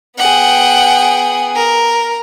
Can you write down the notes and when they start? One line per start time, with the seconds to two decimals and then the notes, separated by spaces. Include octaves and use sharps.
0.18 B3 G#4 F#5 G5
1.56 A#4